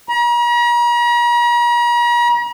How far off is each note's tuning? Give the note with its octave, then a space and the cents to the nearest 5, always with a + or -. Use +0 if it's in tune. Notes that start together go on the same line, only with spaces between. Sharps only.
A#5 +45